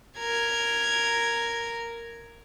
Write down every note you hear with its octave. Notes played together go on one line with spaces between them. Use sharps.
A#4 G#6